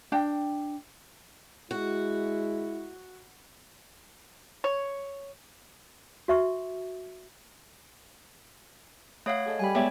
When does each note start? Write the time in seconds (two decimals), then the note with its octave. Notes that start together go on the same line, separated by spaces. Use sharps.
0.12 D4 G5
1.71 G#3 E4 F#4
4.64 C#5
6.28 F#4 E5 C#6
9.26 A3 C#5 F5 F#5 D#6
9.46 G#4 A4 D#5
9.59 G3 G#5 B5
9.75 G#3 B3 G4 C#5 D5 E5 D6